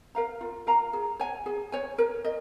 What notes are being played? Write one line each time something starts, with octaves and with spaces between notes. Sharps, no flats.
A#4 F5 A#5
F4
A#4 F5 A#5
G#4
C#5 G#5
G#4
C#5 G#5
A#4
D#5